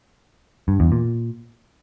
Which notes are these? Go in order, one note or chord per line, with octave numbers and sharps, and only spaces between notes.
G2
E2
A#2